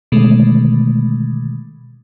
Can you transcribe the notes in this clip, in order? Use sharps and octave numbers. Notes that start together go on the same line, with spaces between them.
B2 D3 D#3 G#3 A3